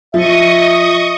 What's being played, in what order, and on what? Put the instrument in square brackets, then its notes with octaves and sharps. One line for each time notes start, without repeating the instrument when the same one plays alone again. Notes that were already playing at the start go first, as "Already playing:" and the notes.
[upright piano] F3 [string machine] D#5 C#6 D#6 [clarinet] E5